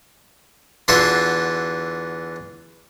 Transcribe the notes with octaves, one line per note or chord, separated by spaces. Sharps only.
E2 D3 F4 F#4 E5 C6